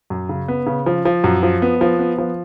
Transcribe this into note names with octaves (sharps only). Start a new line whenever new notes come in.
F#2
C#3
B3
C#3
F3
F3
F#2
F3
B3
F3
B3
F3